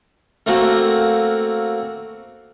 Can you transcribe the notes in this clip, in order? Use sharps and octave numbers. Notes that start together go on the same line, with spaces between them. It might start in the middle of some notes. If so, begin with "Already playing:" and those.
A3 A#3 C4 F#4